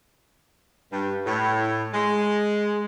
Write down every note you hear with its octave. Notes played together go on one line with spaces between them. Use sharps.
G2
A2
G#3